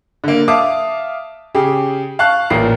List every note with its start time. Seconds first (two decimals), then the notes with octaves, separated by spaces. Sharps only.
0.24 D3 A#3
0.48 E5 F5 A5 D6 D#6
1.55 C#3 G4 G#4
2.19 F5 A5 C#6 F#6
2.50 A1 A#2 A#4 C7